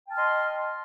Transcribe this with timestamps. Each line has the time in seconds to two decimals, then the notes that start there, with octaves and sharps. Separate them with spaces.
0.08 G5
0.10 A5
0.13 F6
0.16 C6
0.18 D#5